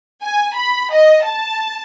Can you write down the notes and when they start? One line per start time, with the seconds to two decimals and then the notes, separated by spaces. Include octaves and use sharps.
0.23 G#5
0.55 B5
0.92 D#5
1.24 A5